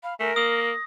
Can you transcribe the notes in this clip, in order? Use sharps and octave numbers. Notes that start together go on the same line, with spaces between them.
F5 B5
A3 A#4 G#5
A#3 D#6 A#6